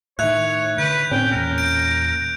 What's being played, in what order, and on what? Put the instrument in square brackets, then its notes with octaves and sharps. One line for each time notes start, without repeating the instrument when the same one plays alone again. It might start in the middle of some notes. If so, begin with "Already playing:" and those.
[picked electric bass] A2 D#3 [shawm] C#5 [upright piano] E5 [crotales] F#6 G#6 F7
[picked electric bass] D3 [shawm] B4 [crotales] G6
[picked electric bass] A2 C4 [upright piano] C#4 [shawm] G5
[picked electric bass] E2 A#2 [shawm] A#4
[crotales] G6 D7